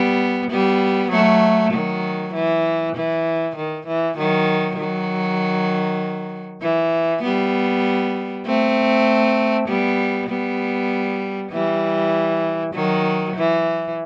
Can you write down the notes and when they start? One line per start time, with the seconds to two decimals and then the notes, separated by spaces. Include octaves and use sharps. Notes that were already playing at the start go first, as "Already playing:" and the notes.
Already playing: G3 B3
0.50 G3 B3
1.11 F#3 A3
1.72 D#3 F#3
2.34 E3
2.95 E3
3.56 D#3
3.87 E3
4.17 D#3 F#3
4.78 D#3 F#3
6.62 E3
7.23 G3 B3
8.46 A3 C4
9.68 G3 B3
10.29 G3 B3
11.52 E3 G3
12.74 D#3 F#3
13.36 E3